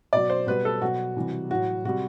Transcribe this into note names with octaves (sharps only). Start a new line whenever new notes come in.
B2 F#3 D5
C5
B2 G3 B4
A4
B2 F#3 F#4
C3 E3 G3
A2 F#3 F#4
C3 G3 F#4